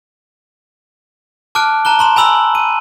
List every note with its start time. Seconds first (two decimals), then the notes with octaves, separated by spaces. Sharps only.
1.55 A5 D6 F6 F#6 D7
1.85 A5 A#5 F#6 G7
1.99 A#5 C6 E7
2.16 G#5 B5 E6 F#7
2.55 D#7